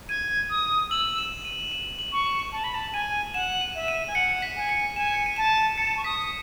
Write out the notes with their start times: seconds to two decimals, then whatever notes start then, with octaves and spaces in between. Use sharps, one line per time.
0.09 G#6 D#7
0.50 D#6
0.90 E6 F#7
1.18 E7
1.45 D#7
1.72 E7
1.99 F#7
2.12 C#6
2.26 E7
2.52 A5
2.64 B5
2.75 A5
2.93 G#5 D#7
3.34 F#5 E7
3.61 D#7
3.75 E5
3.88 D#7
4.08 G#5
4.15 F#5 C#7
4.42 B6
4.56 G#5 D#7
4.69 C#7
4.96 G#5 E7
5.14 C#7
5.26 D#7
5.36 A5 E7
5.78 A5 C#7
5.97 C#6
6.04 D#6 B6